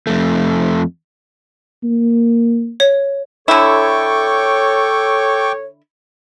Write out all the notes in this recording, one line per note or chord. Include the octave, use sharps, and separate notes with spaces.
F2 A3
A#3
C#5
D3 E4 A4 C#5 G5 C#6 D6